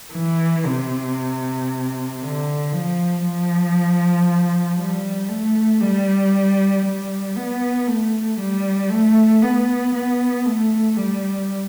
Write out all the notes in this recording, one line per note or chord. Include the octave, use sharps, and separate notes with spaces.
E3
C3
D3
F3
F3
G3
A3
G3
G3
B3
A3
G3
A3
B3
B3
A3
G3